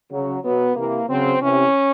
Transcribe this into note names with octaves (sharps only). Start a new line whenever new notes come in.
C#3 F#3
B2 F#3 B3
C3 E3 A#3
C#3 F#3 C4
C3 E3 C#4